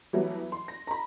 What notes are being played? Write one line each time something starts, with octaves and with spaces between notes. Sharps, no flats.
E3 F#3 G3 A3 B3
C6
A#6
A#5 B5